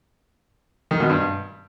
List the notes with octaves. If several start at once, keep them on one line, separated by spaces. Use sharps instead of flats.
D#3
B2
G2